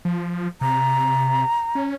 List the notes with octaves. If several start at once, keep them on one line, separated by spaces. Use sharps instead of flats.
F3
C3 A#5
C#4